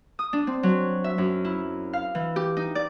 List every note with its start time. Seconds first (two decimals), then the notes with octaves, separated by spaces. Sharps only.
0.19 D#6
0.33 D4
0.47 C4
0.63 F#3
1.04 E5
1.18 F#2
1.45 E4
1.93 F5
2.15 E3
2.36 G4
2.57 D#4
2.75 D5